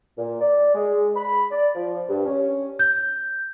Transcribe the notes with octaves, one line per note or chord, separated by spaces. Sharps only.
A#2
D5
G#3
B5
D5
F3
G2
C#4
G6